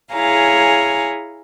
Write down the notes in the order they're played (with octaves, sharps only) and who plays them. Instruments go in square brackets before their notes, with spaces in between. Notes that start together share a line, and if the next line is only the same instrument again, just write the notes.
[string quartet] E4 G#4 C#5 F5 G#5 A#5